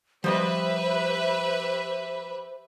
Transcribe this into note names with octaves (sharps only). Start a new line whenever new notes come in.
F3 G3 G4 B4 C5 D#5 E5